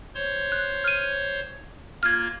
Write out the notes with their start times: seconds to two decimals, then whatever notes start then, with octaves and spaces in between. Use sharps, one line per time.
0.15 C5 C#5 C6
0.52 F#6
0.84 F6 D#7
2.03 A#3 F4 F6 G#6